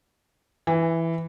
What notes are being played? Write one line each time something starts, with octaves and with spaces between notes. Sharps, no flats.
E3